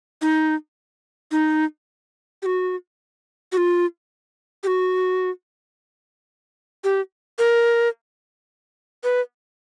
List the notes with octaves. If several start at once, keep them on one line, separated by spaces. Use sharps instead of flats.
D#4
D#4
G4
F#4
F#4
F4
G4
F#4
G4
A#4
B4